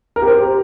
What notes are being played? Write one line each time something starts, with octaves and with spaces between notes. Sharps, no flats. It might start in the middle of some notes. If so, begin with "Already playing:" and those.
A#4
G4
C5
G4